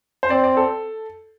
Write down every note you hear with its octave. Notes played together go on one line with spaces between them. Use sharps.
C5
C4 D5
D5
A4